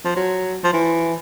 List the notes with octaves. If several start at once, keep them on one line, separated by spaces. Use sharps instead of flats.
F3
F#3
F3
E3